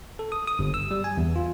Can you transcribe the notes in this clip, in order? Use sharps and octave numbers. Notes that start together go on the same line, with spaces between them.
A4
D#6
D#6
G1
E6
G3
G#5
E2
F4